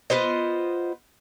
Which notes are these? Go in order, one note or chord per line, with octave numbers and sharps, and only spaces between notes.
B3 F4 C5 D#5